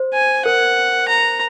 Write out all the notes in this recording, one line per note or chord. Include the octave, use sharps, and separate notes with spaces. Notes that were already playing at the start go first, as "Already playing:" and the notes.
Already playing: C5
G#5
A#4 F#5
A#5